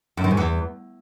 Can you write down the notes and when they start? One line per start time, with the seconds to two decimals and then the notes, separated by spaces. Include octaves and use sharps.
0.17 F#2
0.24 D#3
0.31 G#2
0.37 E2